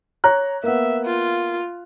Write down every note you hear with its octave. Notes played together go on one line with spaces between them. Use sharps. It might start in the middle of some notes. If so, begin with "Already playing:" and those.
C#5 A#5 F#6
A#3 B3 E5
F4